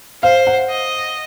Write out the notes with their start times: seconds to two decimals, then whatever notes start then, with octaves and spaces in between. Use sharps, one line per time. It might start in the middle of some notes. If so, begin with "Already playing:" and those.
0.23 C5 F5
0.47 F#5
0.70 D#5